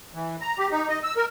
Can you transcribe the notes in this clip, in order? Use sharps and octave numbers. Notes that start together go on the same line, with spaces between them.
E3
A#5
G4
D#4
D#5
E6
A#4